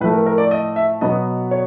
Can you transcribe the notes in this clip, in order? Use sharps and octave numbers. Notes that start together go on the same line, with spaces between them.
A2 F3 A3 B4
A#4
A#4
D5
D#5
E5
B2 F#3 B3 D#5
C#5